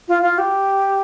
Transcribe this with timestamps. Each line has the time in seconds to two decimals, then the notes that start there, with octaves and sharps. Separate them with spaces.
0.08 F4
0.22 F4
0.38 G4